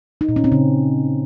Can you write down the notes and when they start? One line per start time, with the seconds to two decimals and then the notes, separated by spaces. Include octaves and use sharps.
0.21 D#4
0.29 A#2
0.36 C#4
0.44 C4
0.52 C#3